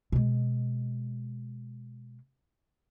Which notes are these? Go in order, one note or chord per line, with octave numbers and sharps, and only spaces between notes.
B2 G#3